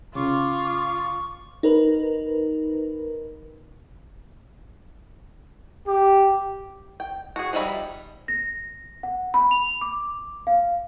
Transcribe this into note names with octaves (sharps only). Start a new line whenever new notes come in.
C#3 F4 C#6 D6
D#4 A#4 B4
G4
G5
F#4 G#4
F3 G3 D#4 E5 B5
A#6
F#5
B5
F7
D6
F5